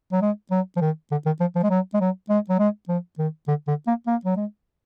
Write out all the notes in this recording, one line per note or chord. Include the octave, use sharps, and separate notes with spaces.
F#3
G#3
F#3
F3
D#3
D3
D#3
F3
F3
G#3
F#3
G#3
F#3
G#3
F#3
G#3
F3
D#3
D3
D3
A#3
A#3
F#3
G#3